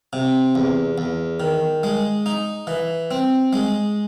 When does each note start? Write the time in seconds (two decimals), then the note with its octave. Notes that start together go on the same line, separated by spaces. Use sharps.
0.13 C3
0.55 E2
0.98 E2
1.40 D#3
1.83 G#3
2.26 D#4
2.67 E3
3.11 C4
3.53 G#3